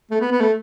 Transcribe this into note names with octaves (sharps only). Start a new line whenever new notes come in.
A3
B3
B3
A3